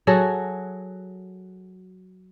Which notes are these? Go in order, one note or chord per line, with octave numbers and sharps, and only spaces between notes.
F#3 F#4 G#4 A4